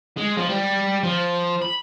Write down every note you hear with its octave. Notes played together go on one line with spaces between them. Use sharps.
G#3
F3
G3
F3
B5